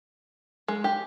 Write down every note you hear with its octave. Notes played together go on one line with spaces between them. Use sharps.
G#3
G4